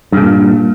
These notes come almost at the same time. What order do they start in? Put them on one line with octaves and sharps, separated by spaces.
G2 C#3 A#2